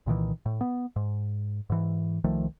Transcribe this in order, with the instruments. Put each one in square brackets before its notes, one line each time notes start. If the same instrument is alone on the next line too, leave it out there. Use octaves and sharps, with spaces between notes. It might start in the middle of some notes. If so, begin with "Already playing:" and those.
[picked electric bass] C2 A#2 D#3 E3
A2
B3
G#2
G#2 E3
C2 D#3 F3 A3